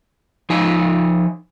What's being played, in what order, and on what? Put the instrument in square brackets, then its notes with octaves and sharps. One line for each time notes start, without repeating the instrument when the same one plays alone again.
[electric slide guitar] F3 D#4 G#5